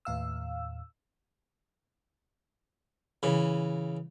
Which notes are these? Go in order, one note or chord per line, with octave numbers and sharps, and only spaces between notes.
D#2 A2 F5 E6
C#3 E3